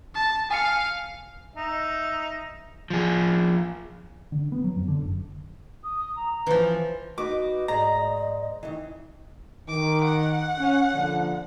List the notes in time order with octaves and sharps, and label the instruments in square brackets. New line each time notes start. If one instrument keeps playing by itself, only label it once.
[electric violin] A5
[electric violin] F5 [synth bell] G#5 C#7
[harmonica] D#4 E5
[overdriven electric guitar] F3 G#4
[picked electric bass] D3
B3
F#3
F2
D3
F#1
[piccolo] D#6
A#5
[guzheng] E3 F3
[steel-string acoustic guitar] D#4 F#4 B4 [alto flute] D#5 [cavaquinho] D6
[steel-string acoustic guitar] G#2 C5 D5 [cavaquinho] A#5
[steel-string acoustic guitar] D#3 E3
[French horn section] D#3 [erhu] D6
[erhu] F#5
[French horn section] C#4
A#2 D3 F3